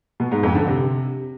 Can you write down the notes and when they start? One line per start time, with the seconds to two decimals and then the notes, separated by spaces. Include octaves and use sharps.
0.20 B2
0.31 G#2
0.43 F2
0.55 D3
0.67 C3